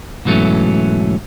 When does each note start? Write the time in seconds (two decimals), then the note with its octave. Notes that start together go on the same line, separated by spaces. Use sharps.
0.25 G#2 B2 E3 F#3 A3 C#4